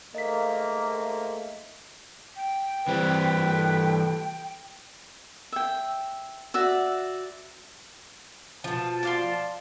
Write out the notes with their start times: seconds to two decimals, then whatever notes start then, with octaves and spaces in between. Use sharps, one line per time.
0.15 G#2 A3 A#3 D#5 B6
2.36 G5
2.88 E3 G3 C4 B4
3.53 A4
5.52 E5 G5
6.54 F#4 D5 E5
8.64 B2 F3 A5
9.03 D5 F5 C6